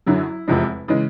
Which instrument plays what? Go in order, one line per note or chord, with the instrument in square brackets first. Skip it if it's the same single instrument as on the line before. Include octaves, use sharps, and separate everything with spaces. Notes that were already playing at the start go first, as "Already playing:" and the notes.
[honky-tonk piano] F#2 D3 F#3 E4
F1 E2 C3 F3 G#3
C#3 E3 G#3